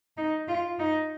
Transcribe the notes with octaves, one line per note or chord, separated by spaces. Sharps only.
D#4
F4
D#4